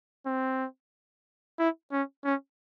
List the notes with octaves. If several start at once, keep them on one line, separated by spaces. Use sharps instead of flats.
C4
E4
C#4
C#4